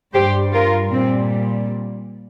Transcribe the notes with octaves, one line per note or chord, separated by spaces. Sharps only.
G2 G3 G4 C5
F4 A#4
A#2 G3 C4